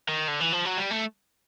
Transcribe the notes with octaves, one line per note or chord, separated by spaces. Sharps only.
D#3
D3
E3
F3
F#3
G3
A3